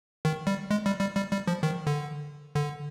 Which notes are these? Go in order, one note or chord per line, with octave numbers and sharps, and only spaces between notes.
D#3
G3
G#3
G3
G3
G3
G3
F3
D#3
D3
D3